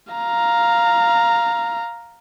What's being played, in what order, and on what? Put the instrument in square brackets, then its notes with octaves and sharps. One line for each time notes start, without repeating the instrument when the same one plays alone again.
[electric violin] F5 A#5